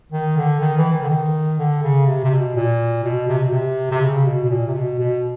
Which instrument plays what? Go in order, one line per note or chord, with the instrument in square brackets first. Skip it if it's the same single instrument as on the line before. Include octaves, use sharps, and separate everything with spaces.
[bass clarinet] D#3
D3
D#3
E3
D#3
D3
D#3
D3
C#3
C3
C3
B2
A#2
B2
C3
B2
C3
C3
C#3
B2
B2
A#2
C3
B2
B2